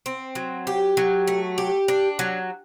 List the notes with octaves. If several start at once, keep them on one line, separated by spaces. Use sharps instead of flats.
C4
F#3
G4
F#3
A3
G4
D4
F#3